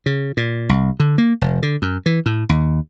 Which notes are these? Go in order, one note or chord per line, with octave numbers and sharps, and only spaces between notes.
C#3
A#2
C2
D3
A#3
F1
D3
F#2
E3
A2
D#2